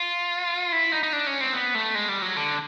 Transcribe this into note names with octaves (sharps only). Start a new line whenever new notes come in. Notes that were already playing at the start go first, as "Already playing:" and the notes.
Already playing: F4
E4
D#4
D#4
D4
C#4
C4
B3
A3
G#3
G3
F#3
D3